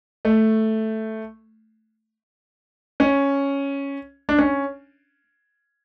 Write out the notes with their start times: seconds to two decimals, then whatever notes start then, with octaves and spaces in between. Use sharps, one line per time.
0.25 A3
3.00 C#4
4.29 D4
4.38 C#4